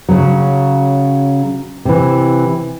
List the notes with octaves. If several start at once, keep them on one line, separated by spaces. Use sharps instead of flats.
C#3 F#3
C3 E3